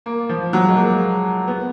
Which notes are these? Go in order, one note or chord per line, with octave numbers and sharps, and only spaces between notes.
A#3
F3
F#3
G#3
A#3
B3